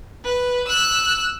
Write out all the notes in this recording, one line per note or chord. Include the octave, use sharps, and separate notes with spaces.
B4
E6 F#6